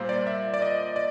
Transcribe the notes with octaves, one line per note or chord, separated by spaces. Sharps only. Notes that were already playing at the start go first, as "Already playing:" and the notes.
Already playing: A#2 G3 A#3 C5 F5
D5
E5
D5
D#5
D5